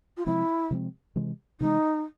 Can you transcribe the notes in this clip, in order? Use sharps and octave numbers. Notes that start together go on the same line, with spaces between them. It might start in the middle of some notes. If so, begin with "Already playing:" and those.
F4
C3 F3 G#3 C4 E4
C3 F3 G#3 C4
C3 E3 G#3
C3 E3 G#3 D#4